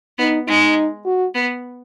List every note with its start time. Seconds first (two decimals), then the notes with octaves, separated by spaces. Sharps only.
0.18 B3 D#4
0.48 G#3 D#4
1.06 F#4
1.35 B3